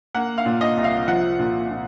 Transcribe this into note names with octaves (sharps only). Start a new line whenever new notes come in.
A#3 F#5
F5
A#2
D#5
C2
F5
F3 F#5
A#2
A#2